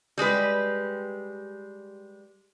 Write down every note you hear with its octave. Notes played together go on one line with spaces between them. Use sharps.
G3 G#3 G4 B4